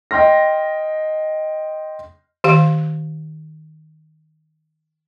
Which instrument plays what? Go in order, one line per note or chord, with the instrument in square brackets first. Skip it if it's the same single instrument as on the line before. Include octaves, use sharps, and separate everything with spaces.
[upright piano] D#5 G5 C6 F6 A#6
[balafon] D#3 G4 F5